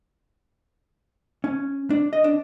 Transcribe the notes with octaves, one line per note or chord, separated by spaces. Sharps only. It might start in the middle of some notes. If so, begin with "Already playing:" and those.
C#4
D4
D#5
D4